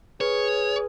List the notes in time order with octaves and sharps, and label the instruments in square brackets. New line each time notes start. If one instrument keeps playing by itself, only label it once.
[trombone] G#4 [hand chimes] B4 [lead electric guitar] C#5